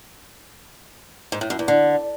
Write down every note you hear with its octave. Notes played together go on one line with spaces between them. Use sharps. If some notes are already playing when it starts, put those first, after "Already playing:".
G#2
A2
F#2
E2
D3